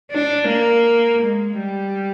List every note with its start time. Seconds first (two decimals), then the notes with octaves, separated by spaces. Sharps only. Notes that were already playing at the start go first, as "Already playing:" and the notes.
0.11 D4
0.48 A#3
1.23 G#3
1.59 G3